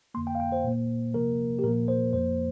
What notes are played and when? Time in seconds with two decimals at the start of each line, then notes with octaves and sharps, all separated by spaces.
0.14 F2 D3 A#3 C6
0.27 G5
0.35 F5
0.40 G5
0.52 C5
0.64 A#2 A#3
1.14 C3 F3 A#3 A#4
1.59 G4
1.63 A#2 F3 A#3 A#4
1.88 C5
2.13 F2 F3 A#3 C5